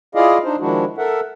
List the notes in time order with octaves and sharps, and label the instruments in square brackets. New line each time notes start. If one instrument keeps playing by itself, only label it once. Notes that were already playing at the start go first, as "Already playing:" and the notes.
[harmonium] E4 F4 G#4 D5 D#5 F5
D4 D#4 C5
D#3 F3 G#3 D4 E4 F#4
A4 A#4 E5 F#5